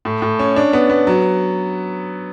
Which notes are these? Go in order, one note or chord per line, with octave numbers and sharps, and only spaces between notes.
A2
A2
C#4
D4
B3
B3
F#3